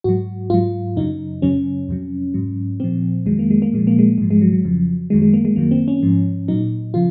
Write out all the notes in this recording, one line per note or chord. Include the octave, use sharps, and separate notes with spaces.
G#2 F#3 F#4
G#2 F#3 F4
F#2 C#3 F#3 D#4
F#2 C#3 F#3 C#4
F2 C3 F#3
G#2 F#3
A#2 F3 C4
F2 D#3 F#3 G#3
A#3
G#3
A#3
A#2 F3 G#3
A#3
G#3
G#2 F3 G#3
G#3
F#3
F#3
F2 C#3 F3
F#2 D#3 F#3 G#3
G#3
A#3
G#3
F#2 D#3 F#3 A#3
C4
C#4
G#2 F3
A#2 F#3 D#4
C#3 F3 F4